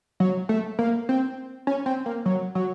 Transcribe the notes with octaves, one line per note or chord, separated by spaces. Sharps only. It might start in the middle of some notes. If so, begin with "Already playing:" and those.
F#3
A3
A#3
C4
C#4
C4
A#3
F#3
F#3